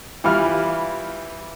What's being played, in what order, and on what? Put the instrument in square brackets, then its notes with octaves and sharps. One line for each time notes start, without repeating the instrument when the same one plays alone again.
[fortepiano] E3 G3 E4 F4 F6